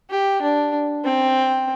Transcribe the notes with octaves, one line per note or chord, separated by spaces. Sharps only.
G4
D4
C4